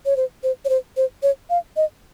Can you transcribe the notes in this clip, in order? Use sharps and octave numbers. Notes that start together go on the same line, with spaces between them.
C#5
C5
C5
C#5
C5
C5
C#5
F5
D#5